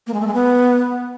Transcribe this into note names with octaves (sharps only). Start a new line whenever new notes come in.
A#3
G#3
A3
G#3
B3